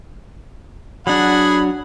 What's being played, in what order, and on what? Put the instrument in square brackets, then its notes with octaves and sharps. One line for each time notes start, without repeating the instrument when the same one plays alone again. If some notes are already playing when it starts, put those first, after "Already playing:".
[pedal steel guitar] F#3 D4 [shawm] G#4 [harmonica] F#5 B5